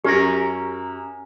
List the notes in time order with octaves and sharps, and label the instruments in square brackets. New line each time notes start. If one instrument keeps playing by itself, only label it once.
[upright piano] F#2 [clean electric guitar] C#4 A#4 [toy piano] G4